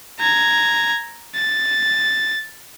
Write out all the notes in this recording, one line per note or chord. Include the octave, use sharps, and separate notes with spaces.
A#5 G#6
A6